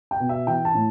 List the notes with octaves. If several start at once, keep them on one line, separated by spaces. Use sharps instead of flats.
G5
B2
E5
E3 G5
A5
A2